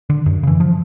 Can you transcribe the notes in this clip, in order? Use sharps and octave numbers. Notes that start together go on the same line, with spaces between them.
D3
F#2
C#3 E3
F3